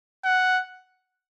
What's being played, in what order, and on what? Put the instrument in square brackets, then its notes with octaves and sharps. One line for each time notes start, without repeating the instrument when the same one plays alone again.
[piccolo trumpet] F#5